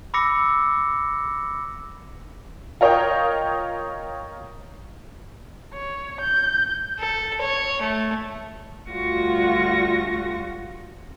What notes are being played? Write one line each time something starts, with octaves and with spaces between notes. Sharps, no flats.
B5 D6 E6 A#6 C#7
F4 A#4 C#5 D#5 G5
C#5
G6
A4
C#5
A3
D2 G3 F4 F#4 C#6 A#6